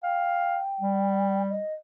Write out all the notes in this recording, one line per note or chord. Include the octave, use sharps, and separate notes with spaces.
F5 G5
G3
D#5